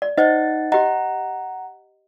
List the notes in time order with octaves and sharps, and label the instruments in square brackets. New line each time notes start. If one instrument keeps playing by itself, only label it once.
[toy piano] D5
[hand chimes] D#4 F#5 A6 [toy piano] C5 D#5
[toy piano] G4 D#5 [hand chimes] F#5 A#5